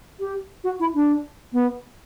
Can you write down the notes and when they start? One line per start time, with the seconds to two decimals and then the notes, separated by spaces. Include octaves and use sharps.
0.20 G4
0.64 F#4
0.80 E4
0.95 D4
1.53 B3